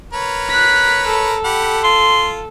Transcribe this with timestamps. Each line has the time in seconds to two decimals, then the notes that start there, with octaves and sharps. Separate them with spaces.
0.13 A#4 B4 C#5
0.49 F#6 B6
1.07 A4
1.44 G4 F#5 B5
1.84 F4 C6